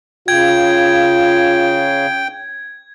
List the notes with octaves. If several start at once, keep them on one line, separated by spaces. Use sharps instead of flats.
C#3 F4 G5 G#6